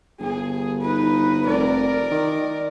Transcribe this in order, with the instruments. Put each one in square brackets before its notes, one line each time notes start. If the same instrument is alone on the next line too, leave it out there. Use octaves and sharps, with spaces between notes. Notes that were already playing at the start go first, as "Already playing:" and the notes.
[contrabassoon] G1 [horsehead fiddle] G#4
[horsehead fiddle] D#4 B4
[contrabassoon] F1 [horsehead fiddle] A#4 D5
[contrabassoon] D#3